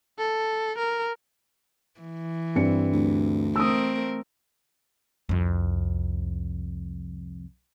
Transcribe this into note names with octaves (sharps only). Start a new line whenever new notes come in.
A4
A#4
E3
G2 C4 C#7
D2
A3 C4 A#4 D#6 E6
C2 F2